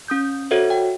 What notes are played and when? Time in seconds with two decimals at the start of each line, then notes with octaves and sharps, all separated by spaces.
0.08 C#4 D#6 G6
0.51 F#4 A4 C5 C#5 E5 F#5
0.70 G5